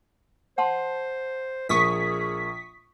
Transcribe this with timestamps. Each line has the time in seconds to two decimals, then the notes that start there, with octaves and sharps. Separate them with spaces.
0.58 C5 F#5 A5 C6
1.69 A#1 A#3 G#4 C#6 D#6 B6